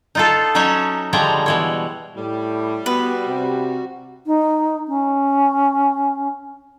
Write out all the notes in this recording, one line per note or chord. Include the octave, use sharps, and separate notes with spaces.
D#4 F4 A4
F#3 C#4 D#4 F#4 C#5 E5
D3 F3 G3 G#3 C#5 A#5
B2 E3 C#5
A2 G3
B3 F#4 B4
C3
D#4
C#4